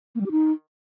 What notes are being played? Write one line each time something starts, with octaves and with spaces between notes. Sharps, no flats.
A#3
G3
G4
D#4